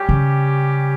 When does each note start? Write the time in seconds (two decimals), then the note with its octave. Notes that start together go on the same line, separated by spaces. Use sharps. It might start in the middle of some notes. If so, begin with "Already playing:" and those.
Already playing: G3 C#4 G4
0.09 C#3